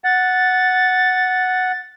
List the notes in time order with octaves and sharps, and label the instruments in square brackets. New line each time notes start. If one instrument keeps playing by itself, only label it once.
[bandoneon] F#5 [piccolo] A6